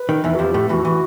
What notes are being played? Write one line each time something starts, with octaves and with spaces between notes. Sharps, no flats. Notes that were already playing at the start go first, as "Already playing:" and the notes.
Already playing: B4
D#3
E2 E3
F#4
F2 F3 G4
A2 A3
E2 E3 F#4
E3